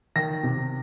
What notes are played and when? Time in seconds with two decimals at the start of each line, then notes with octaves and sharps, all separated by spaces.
0.16 D#3 A#6
0.43 C3